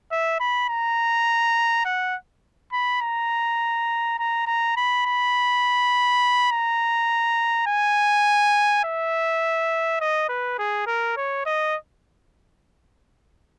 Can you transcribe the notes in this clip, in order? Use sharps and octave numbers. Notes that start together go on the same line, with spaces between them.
E5
B5
A#5
F#5
B5
A#5
A#5
A#5
B5
B5
A#5
G#5
E5
D#5
B4
G#4
A#4
C#5
D#5